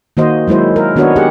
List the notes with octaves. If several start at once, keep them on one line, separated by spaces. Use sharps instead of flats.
D#3 A#3 F#4 C5 D#5
F#3 G#3 E4 C5
A#4
D#3 B3 D4 F#4 C#5 D#5
G4 G#4 F#5